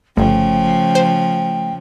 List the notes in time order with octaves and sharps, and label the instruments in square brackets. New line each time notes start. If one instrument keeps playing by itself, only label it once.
[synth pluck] G1 [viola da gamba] C#3 F3 [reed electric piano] A3 [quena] G5
[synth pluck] C5